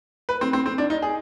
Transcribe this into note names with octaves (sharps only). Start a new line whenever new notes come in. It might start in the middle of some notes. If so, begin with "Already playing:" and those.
B4
C4
C4
C4
D4
D#4
G#4